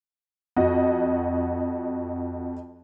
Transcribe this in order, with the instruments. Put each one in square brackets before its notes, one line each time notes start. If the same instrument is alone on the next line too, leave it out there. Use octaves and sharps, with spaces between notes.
[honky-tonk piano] F2 F#4 D#5